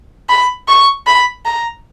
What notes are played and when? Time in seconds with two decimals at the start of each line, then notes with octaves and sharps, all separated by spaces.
0.29 B5
0.68 C#6
1.07 B5
1.46 A#5